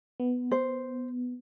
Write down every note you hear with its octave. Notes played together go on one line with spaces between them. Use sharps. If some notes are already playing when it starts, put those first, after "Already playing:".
B3
C5